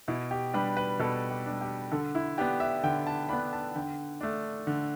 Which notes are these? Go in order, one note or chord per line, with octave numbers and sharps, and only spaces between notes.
B2 E4
G4
G3 D4 B4
B4
B2 A4
G4
G3 D4
G4
D3 A4
E4
B3 D4 G4
E5
D3 G5
A5
B3 D4 B5
A5
D3 G5
A3 D4
D3